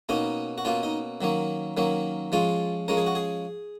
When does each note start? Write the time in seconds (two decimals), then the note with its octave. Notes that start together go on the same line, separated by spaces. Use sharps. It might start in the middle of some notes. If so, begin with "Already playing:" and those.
0.09 B2 A#3 C#4 D#4
0.58 F#4
0.65 B2 A#3 C#4 F4
0.83 D#4
1.21 D#3 F#3 A#3 C#4
1.77 D#3 F#3 A#3 C#4
2.32 F3 G#3 C#4 F4
2.88 F3 G#3 C#4 A#4
2.97 G#4
3.06 F#4
3.15 G#4